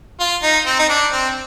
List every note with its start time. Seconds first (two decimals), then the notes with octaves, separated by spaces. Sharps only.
0.20 F4
0.43 D#4
0.66 C4
0.79 D#4
0.89 D4
1.12 C4